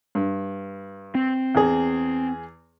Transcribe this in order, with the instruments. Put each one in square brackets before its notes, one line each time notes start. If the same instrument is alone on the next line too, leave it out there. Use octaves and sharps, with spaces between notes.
[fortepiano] G2
[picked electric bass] C4
[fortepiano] E2 G#4